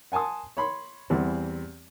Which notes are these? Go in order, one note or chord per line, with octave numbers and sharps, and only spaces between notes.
F#5 G#5 A5 C6 D#6
C#5 B5 C6
E2 E3 G3 C4